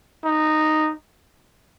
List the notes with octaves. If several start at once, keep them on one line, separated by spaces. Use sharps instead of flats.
D#4